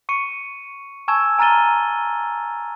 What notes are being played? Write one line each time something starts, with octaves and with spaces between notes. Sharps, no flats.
C#6 C#7 D#7
G#5 A5 C#6 E6 G#6 E7
G#5 A#5 F6 A6 D#7 G7